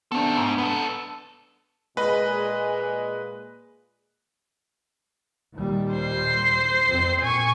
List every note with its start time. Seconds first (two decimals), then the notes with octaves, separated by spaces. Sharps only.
0.12 D#3 B3 C4 D4 A4
0.37 G#2 D4
0.58 B3 A4
1.97 A#2 G#3 B4 D#5 B5
5.55 D#2 A#2 G3
5.95 C5 C7
6.85 F2 C4
7.21 A#2 G#5 C#6